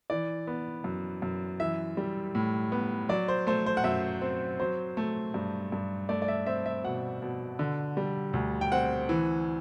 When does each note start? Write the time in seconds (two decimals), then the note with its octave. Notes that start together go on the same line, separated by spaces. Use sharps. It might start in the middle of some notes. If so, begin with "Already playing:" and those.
0.10 E3 D5
0.47 B3
0.84 F#2
1.22 F#2
1.60 E3 E5
1.97 G3
2.35 A2
2.72 B3
3.09 F#3 D5
3.28 C5
3.47 A3 C5
3.66 C5
3.77 F#5
3.84 F#2 E5
4.21 C4
4.60 F#3 C5
4.97 A3
5.34 G2
5.72 G2
6.09 A3 D5
6.22 D5
6.28 E5
6.46 C4 E5
6.66 E5
6.84 B2 F#5
7.22 B2
7.59 D3
7.97 G3
8.33 D2
8.61 G5
8.72 C4 F#5
9.09 E3